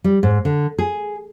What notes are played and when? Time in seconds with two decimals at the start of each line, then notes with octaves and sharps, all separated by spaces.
0.04 G3
0.23 G#2
0.45 D3
0.78 G#4